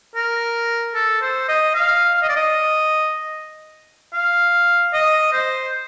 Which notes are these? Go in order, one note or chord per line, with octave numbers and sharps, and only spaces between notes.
A#4
A4
C5
D#5
F5
F5
D#5
D5
D#5
F5
D#5
C5